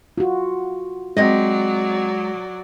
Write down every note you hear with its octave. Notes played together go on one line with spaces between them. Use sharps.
F4 F#4
F#3 G#3 C4 D5 D#5